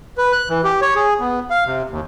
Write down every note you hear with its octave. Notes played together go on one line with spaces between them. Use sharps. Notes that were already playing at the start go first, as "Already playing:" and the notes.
B4
F#6
E3
G4
C#5
G#4
B3
F5
C3
D#2